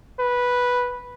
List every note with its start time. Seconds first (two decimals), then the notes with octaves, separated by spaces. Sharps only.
0.20 B4